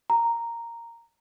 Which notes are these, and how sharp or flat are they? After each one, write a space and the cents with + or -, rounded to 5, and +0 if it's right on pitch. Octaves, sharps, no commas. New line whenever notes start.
A#5 -5